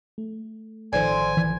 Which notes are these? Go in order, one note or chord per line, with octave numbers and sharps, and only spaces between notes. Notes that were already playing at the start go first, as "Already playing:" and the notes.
A3
A1 D3 D#3 F3 C5 G#5
E3